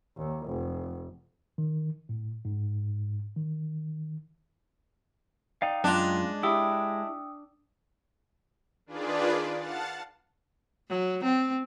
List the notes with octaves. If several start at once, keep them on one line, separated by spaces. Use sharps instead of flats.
D#2
F1
D#3
A2
G#2
D#3
D#4 D5 F5 G5
F#2 G#3 D4 F4 D#5 F#6
E4 G4 G5 D#6 E6
D#3 D4 F4 G#4 B4 D5
F5 F#5 A5 A6
F#3
C4